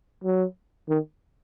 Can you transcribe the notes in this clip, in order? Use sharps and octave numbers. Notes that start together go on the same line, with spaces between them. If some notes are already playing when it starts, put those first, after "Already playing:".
F#3
D#3